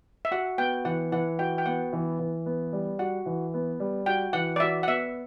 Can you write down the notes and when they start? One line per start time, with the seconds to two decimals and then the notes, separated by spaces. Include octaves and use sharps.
0.25 E5
0.31 F#4 F#5
0.58 B3 G5
0.85 E3 F#5
1.12 E3 F#5
1.39 F#4 G5
1.58 G5
1.66 B3 F#5
1.93 E3
2.19 E3
2.46 B3
2.73 G3
2.99 F#4 F#5
3.26 E3
3.54 B3
3.80 G3
4.06 F#4 G5
4.33 E3 F#5
4.56 D5
4.60 F#4 E5
4.83 F#5
4.87 B3 E5